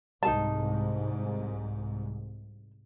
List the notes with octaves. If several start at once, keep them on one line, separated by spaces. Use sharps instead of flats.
C2 G#2 D#4 G#4 A5